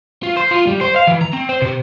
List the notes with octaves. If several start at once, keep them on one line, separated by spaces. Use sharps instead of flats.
F4
C5
F4
G3
C5
F5
E3
A#5
C4
C5
C3